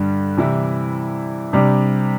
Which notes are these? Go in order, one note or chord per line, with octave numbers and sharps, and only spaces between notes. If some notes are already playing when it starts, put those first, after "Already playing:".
Already playing: G2 D3 G3
C3 E3 G3 E4
C3 G3 D4